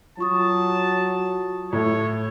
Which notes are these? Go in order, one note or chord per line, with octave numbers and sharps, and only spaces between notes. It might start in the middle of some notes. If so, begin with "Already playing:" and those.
F#3 F4 A5 C#6 D#6
A2 C#5